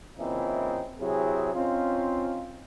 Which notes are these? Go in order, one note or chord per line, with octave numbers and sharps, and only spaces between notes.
A#2 C#3 E3 C4 D#4 E4
C3 F#3 C4 E4 G#4
C4 C#4 D#4 F4